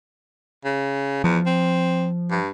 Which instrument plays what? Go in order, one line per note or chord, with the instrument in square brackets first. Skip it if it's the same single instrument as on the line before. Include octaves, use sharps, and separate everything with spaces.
[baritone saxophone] C#3
[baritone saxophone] E2 [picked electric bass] F3
[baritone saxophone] C4
G2